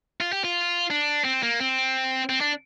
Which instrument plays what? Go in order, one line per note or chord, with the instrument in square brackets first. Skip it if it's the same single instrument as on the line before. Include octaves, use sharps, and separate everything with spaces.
[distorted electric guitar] F4
G4
F4
D4
C4
A#3
C4
C4
D4